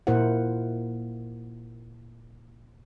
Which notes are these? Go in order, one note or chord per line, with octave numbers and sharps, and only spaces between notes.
A#2 A#3 E4 A#4 C5 F#5